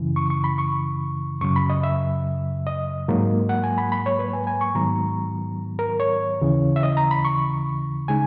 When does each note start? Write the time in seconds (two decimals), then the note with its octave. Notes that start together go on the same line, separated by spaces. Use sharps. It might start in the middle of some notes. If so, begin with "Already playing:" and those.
Already playing: F#2 C#3 E3
0.16 C#6
0.30 C#6
0.44 B5
0.58 C#6
1.41 F#2 C#3 F#3 C#6
1.56 B5
1.70 D#5
1.83 E5
2.67 D#5
3.08 G#2 F#3 A#3
3.49 F#5
3.64 G#5
3.78 B5
3.92 B5
4.06 C#5
4.19 B4
4.33 G#5
4.47 G#5
4.61 C#6
4.75 G#2 D#3 F#3 B3 A#5
5.79 A#4
6.00 C#5
6.41 D#2 C#3 E3
6.76 E5
6.83 D#5
6.97 A#5
7.11 B5
7.25 C#6
8.08 C#3 G#3 D#4 G#5